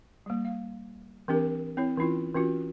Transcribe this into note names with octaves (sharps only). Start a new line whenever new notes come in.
G3 A#3
F5
E3 C4 D4 G4 A#4
C4 E4 C#5
E3 C#4 E4 F4
E3 C#4 F4 F#4